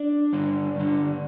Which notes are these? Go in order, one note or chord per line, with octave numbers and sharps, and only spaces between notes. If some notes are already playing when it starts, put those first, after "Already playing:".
Already playing: D4
G2 D3
G2 D3